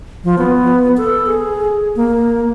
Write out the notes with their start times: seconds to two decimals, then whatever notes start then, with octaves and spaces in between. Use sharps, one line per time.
0.24 F3
0.38 B3
0.97 A4
1.26 G#4
1.96 A#3